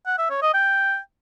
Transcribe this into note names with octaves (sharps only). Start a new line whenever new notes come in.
F#5
E5
C#5
D#5
G5